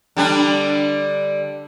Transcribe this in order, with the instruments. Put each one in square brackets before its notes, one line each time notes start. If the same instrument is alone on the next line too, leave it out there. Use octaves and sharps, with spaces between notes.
[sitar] D3 G3 D4